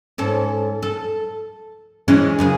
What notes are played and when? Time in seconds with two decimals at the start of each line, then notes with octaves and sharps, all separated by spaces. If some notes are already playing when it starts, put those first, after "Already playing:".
0.18 G#2 C#4 A4
0.83 A4
2.08 E3 G#3 C#4
2.39 F#2 C#3 G#4